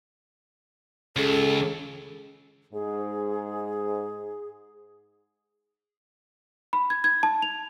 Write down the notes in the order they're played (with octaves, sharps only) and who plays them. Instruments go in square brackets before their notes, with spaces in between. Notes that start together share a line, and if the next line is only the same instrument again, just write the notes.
[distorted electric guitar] C#2 [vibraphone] C#4 G#4 [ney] A4
[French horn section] G#2 [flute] G#4
[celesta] B5
G#6
G#6
A5
F7